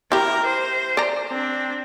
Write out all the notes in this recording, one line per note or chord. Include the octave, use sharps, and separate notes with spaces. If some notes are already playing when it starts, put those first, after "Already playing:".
E4 G4 A#4
C5
D5 A#5
C4 D4